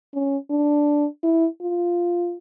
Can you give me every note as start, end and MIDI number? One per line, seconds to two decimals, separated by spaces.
0.14 0.37 61
0.50 1.06 62
1.23 1.46 64
1.62 2.36 65